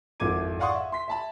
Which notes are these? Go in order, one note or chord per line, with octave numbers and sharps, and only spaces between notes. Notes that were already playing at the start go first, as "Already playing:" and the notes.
G#1 F2 E4 D6 G#6 D#7
D5 F5 F#5 C6 C#6 D#6
E5
C6 B6
E5 A5 B5